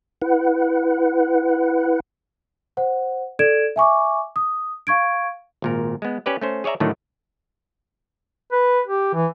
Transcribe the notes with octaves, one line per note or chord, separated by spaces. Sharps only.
E4 B4 F#5
C5 F#5
A4 D5 G#6 D7 E7
E5 G#5 C#6 D6
D#6
F5 C#6 G#6 D7
G#1 A#2 A#4
G#3 B3
C#4 G4 B4 D5
A3 C#4 C5
G#4 C#5 D5 E5 A#5
A2 D3 D#3 F#3 A3
B4
G4
E3